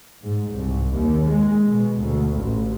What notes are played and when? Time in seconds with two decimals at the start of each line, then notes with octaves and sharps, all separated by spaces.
0.22 G#2
0.54 C2
0.94 D#2
1.27 G#3
1.67 B2
1.98 D2
2.37 A1